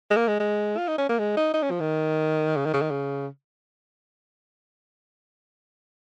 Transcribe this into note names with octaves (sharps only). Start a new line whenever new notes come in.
G#3
A#3
G#3
G#3
F4
D#4
C#4
A#3
G#3
D#4
D#4
C#4
F3
D#3
C#3
D#3
C#3
D#3
C#3